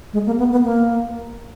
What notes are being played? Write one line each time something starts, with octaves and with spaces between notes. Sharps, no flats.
G#3
A#3
B3
B3
A#3